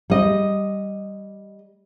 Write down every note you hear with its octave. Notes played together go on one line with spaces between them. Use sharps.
G3 D#5